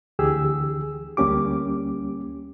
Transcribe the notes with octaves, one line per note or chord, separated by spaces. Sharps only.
D2 D3 E3 G4 G#4 E6
D2 G3 A#3 C#4 G4 D6